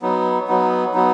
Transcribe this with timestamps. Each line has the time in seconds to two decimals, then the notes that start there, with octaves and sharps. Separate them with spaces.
0.02 F#3 B3 D#4
0.48 F#3 B3 D#4
0.94 F#3 B3 D#4